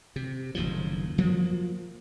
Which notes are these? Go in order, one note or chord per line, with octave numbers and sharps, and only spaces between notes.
C3
F#1 D#2 A2 F3
F3 F#3 A#3